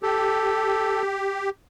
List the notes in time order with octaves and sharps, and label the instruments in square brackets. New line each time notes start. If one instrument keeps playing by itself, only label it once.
[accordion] G4 [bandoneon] A4